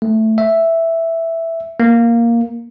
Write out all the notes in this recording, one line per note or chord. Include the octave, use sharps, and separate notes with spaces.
A3
E5
A#3